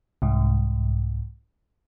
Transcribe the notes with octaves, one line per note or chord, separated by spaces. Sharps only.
C2 G#2